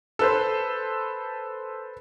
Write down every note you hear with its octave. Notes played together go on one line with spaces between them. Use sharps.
A4 B4 C5